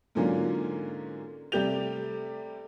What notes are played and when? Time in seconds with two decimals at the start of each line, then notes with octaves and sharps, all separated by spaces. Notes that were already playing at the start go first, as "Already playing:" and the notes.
0.15 G#2 D3 F#3 A#3 C#4 F4
1.52 C3 G3 A3 G4 G6 F7